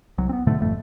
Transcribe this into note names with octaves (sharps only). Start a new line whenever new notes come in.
C2 F#3
B3 C4
G#2 B2 D3 A3
G1 F2 A3